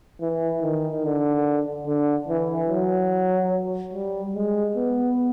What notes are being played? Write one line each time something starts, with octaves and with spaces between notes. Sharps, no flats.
E3
D#3
D3
D3
E3
F#3
G3
G#3
B3